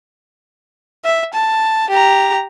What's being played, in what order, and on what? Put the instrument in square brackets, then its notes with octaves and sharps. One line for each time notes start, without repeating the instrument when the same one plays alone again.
[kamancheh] E5
A5
G4 A#5